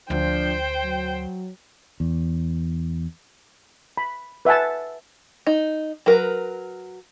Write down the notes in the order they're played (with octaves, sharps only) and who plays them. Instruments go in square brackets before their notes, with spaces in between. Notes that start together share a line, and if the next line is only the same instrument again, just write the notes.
[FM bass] D2 [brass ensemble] F3 D4 [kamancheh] C5 G5
[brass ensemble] F#3
[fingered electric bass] E2
[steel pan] B5
B4 E5 F#5 G#5 A5
[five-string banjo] D#4
F#3 A#4 B4